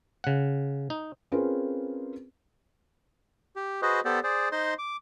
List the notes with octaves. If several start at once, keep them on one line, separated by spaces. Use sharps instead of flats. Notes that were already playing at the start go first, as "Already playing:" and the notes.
C#3 F#5
D#4
C4 C#4 F4 G#4 A#4 B4
G4
F#4 G#4 B4 C5 D#5
B3 G4 A4 C5 D5
G#4 C5 D5
D#4 C5 D#5 C6
D6